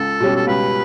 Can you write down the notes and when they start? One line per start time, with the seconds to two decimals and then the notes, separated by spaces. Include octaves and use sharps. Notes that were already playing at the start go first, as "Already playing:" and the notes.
Already playing: C#2 A4
0.20 B2 G3 C#4 G4
0.36 A4
0.47 C#2 B4